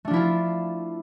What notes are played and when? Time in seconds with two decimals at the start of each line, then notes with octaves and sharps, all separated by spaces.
0.05 A3
0.08 D4
0.11 F3
0.13 E4
0.16 F4